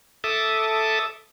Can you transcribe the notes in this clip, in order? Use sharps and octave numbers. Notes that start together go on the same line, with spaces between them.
A4 E5 A5 D6 D#6